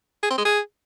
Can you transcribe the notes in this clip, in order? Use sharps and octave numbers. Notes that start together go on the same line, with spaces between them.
G#4
C4
G#3
G#4